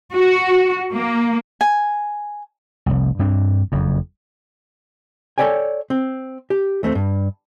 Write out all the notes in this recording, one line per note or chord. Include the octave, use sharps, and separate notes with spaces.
F#4
A#3
G#5
F1 C2
G2 C4 D4
F#1 F2
A4 A#4 C#5 D5 G5 G#5
C4
G4
D#2 A3 C4
G2